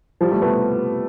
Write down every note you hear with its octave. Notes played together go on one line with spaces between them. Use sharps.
F3 G3
G3 A3
A3 B3